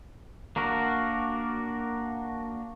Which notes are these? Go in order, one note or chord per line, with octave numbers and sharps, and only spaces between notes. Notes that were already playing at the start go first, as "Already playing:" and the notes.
A#3 D4 F#4 A#4